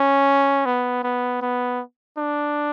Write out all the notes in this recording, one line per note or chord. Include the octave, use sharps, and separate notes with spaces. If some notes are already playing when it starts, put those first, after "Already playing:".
Already playing: C#4
B3
B3
B3
D4